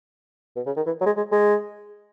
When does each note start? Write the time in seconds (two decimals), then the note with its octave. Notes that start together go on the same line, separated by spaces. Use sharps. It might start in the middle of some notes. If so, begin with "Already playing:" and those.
0.56 B2
0.66 C#3
0.76 D#3
0.86 E3
1.01 F#3
1.06 G#3
1.17 G#3
1.32 G#3